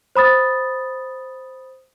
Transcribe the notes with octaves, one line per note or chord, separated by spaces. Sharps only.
C5 B5 D#6 A6